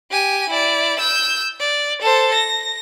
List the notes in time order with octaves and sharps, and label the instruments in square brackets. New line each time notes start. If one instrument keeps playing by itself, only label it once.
[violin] G4 G#5
E4 D5
E6 G6
D5
A4 C5
A#6